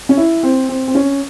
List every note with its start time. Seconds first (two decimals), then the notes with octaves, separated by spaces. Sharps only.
0.09 C#4
0.17 E4
0.43 C4
0.69 C4
0.88 C4
0.95 C#4